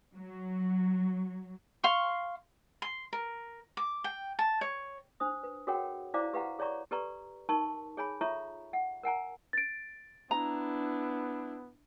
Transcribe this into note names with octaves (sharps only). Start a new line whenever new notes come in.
F#3
F5 C6 C#6
C6
A#4
D6
G5
A5
C#5
D4 C5 D#6
B4
F#4 G#4 A#4 C#5 F#5 G5
E4 C5 D5 F5 A#5 D6
G4 B4 F5 F#5 A#5
G#4 C#5 D5 A#5 C#6
G4 A4 B4 D5 A#5 C#6
D#4 A#4 A5 C6 C#6
G#4 C#5 G#5 B5
F4 A4 C#5 E5 A#5 C#6
F#5
A#4 F#5 G#5 A#5
A6 D7
B3 D4 E4 A#5